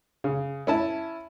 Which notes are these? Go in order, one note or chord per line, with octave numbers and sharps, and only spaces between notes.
C#3
C#4 E4 A5